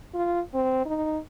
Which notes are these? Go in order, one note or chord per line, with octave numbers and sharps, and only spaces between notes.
F4
C4
D#4